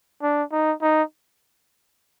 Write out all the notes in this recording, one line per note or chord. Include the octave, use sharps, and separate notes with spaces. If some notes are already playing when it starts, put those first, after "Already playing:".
D4
D#4
D#4